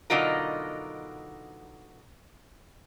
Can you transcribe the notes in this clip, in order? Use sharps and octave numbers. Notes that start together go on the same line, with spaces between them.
B2 D3 F#3 D#4 F4 A#4